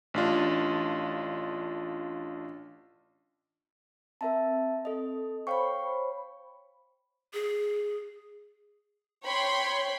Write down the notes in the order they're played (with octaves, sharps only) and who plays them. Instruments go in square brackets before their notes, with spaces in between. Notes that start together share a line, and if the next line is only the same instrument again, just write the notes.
[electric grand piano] A1 D4 F4
[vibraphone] C4 [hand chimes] A#4 E5 A5
[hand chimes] A4 D#5
[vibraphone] C5 C#5 B5 [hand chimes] F5 G5 C#6
[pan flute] G#4
[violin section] C#5 G5 B5 C6